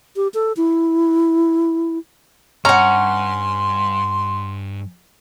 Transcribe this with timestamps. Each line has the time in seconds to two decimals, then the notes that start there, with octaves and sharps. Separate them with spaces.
0.16 G4
0.34 A4
0.57 E4
2.65 G2 C#4 F#5 A#5 C6